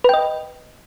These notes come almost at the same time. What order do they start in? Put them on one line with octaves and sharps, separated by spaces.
B4 G5 D#5